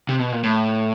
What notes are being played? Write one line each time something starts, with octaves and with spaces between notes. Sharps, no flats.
C3
B2
A#2
A2